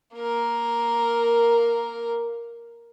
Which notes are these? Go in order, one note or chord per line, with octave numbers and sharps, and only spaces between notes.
A#3 A#4